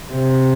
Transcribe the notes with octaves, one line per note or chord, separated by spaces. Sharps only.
C3